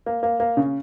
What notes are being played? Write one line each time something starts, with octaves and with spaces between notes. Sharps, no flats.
A#3
A#3
A#3
C#3